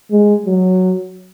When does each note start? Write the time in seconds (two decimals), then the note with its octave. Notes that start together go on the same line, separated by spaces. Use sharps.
0.11 G#3
0.46 F#3